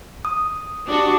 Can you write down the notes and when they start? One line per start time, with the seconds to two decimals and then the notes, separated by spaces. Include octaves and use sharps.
0.25 D#6
0.87 D4 F#4 G4